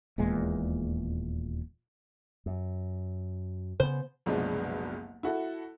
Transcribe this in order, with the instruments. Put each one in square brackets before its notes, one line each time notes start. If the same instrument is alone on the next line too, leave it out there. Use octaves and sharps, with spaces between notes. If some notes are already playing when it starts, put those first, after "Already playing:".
[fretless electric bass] D#1 E2 A#2 G#3
[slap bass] F#2
[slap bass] C#3 B3 [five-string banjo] C5
[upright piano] F#1 C2 B2 F3 G#3 D4
E4 F#4 A4